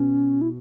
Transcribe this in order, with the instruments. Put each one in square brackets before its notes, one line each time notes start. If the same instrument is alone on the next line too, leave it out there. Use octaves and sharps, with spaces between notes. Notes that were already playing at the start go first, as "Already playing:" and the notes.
Already playing: [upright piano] B2 [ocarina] C#4
[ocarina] E4